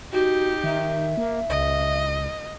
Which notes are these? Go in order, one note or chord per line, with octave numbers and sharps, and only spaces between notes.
D#4 F#4 G4
D#3 E5
A#3
C#2 D#5